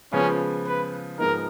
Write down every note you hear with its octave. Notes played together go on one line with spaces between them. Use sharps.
C#3 F3 G#3 B3 C#4 F4
B4
G#2 F3 G#3 B3 D#4 A#4